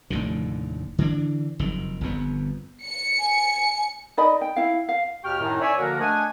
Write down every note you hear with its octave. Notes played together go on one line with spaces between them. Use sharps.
F1 D#2 A2 D3
D3 E3 D4
F#1 F2 D#3
G1 F2 B3
C#7
G#5
D#4 D5 D#5 B5
G5
E4 F5
F5
D#2 B2 G4 G5 C#6 F6
F#2 A2 D#3 D#4
C#5 D5 E5 G#5
D3 F3 A#3 F#4 A#4
A3 D4 D#5 F#5 G#5